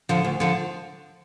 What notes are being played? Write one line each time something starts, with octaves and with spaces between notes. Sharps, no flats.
D3 F3
D2
D3 F3